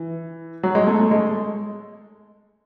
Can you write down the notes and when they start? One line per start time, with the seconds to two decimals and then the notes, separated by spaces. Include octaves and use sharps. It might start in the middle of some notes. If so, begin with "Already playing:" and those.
Already playing: E3
0.63 F#3
0.75 G#3
0.87 A3
0.99 A3
1.11 G#3